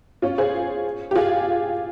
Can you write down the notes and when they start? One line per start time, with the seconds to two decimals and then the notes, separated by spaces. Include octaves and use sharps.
0.22 C#4 F4
0.38 G#4 C5
1.11 G4
1.15 F4 G#4